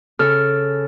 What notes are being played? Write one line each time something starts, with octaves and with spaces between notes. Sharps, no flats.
C#3 A4 F6